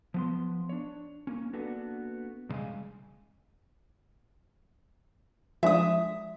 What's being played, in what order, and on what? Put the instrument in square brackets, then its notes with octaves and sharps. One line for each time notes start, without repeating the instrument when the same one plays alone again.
[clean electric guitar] F3 B3 C6
D4 C#5
A#3 C#4
A#3 B3 D4 F#4 A4 B4
F2 C#3 G3 G#3 G#5
[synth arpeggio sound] F3 G#3 D4 [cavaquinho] E5 D#6